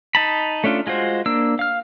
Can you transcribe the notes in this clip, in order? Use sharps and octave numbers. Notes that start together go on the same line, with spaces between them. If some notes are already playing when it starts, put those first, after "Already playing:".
D#4 A5 B5
A3 C#4 D4 F4
G#3 F4 F#4 C5
A#3 D4 E6
F5 F6